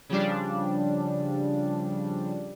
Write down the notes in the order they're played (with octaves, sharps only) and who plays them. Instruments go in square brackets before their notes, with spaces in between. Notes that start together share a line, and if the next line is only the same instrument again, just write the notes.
[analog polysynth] C#3 F3 G3 D4